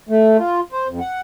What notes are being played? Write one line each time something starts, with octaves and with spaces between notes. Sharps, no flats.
A3
F4
C5
F2
F#5